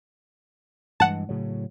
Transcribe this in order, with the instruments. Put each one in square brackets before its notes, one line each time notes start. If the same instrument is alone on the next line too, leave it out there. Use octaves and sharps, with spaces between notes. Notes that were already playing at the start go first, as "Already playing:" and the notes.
[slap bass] G2 E3 G#3 [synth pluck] F#5 A5
[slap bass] A2 C#3 F#3